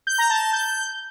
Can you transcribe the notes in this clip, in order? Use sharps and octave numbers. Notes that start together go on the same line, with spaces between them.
G6
A#5
A5
A5
G6